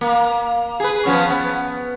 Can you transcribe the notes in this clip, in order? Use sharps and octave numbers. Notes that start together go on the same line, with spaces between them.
A#3
G#4 B4
F3 B3 C#4
B3